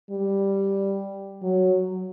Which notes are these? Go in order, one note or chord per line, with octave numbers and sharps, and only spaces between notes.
G3
F#3